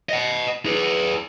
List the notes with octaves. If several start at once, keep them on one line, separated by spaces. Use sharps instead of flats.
D#5 F#5
G#4 B4